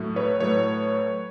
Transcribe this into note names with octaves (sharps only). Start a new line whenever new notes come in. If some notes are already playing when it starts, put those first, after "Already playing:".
Already playing: A2 F#3 A3
B4 C#5
A2 F#3 A3 B4 C#5